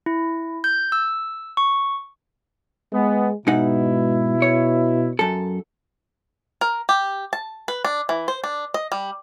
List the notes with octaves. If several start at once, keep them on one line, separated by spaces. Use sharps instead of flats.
E4
G6
E6
C#6
G#3 B3
G#2 B2 D#4 E4 F#5
C#5
F#2 A4
A#4
G4
A5
B4
D4
E3
C5
D4
D#5
G3